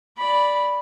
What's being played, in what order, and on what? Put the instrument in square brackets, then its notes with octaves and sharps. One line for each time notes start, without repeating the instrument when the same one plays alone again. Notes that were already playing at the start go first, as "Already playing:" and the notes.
[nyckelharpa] D5 B5